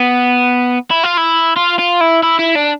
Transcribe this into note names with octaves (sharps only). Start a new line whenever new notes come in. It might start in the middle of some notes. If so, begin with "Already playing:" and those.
Already playing: B3
E4
F4
E4
F4
F4
E4
E4
E4
D4